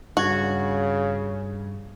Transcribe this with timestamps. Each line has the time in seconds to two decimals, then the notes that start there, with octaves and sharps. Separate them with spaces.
0.17 G2 C#3 F#4 G#6